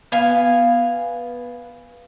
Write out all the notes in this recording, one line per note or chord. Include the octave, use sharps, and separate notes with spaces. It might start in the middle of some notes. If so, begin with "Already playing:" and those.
B3 F5 G#5